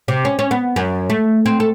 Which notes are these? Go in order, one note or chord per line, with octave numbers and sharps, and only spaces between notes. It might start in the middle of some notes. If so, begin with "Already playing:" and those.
C3
C#4
C#4
B3
F#2
A3
C4
A4